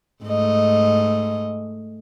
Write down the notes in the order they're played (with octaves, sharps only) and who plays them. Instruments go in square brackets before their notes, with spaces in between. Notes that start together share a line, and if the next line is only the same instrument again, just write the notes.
[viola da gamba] G#2 A3 D#5